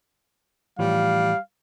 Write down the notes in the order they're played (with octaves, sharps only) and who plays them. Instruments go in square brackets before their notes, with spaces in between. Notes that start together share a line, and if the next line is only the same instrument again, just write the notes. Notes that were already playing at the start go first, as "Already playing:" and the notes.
[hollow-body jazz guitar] A2 E3 F3 [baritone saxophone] G3 [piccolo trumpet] F5